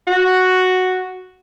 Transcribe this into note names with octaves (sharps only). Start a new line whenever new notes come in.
F#4